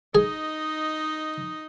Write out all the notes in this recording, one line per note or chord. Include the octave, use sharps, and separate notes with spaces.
D#4 G#4 D#5